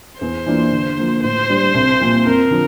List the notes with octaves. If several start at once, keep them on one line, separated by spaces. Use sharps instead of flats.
E2 C5
E3 A#3 D4 F4
D3
F3 A#3
A2 C5
G3 D4
C2
A#2 F3
F2 A#4
D3 F3